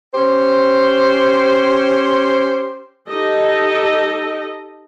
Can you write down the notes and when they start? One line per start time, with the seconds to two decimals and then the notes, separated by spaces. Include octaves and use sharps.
0.14 C#4 G4 C5
3.07 D#4 G4 A4 D#5